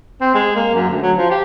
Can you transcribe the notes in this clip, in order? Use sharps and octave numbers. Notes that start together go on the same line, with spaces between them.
C4
G#3
A#3
F#2
D2
F#3
F3
G4